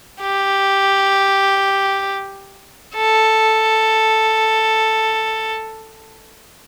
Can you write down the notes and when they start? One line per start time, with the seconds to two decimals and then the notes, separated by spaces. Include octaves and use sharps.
0.21 G4
2.95 A4